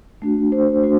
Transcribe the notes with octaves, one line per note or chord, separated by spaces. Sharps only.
A3 D4 F#4
C5
A3 D4 F#4